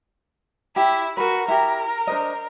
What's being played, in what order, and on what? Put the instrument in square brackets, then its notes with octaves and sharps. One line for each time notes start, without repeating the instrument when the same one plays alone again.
[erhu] E4 [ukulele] G4 G5
[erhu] F#4 [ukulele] A#4 B4
[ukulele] E4 G4 [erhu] A#4
[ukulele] D4 C5 D#5